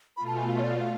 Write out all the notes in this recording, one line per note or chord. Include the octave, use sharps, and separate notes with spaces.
B2 A3 F4 B5
A5
G#5
F5
C#5
D5
F5